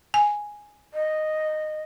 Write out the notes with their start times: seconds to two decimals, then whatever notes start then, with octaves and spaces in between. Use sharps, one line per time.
0.14 G#5
0.94 D#5